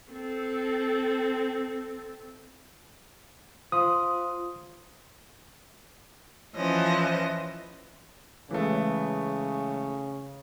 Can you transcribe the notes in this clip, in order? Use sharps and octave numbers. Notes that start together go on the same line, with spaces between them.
C4 A4
F4 C5 F5 C6 D#6
E3 F3 C#4 D#5
C#3 E3 G#3 A3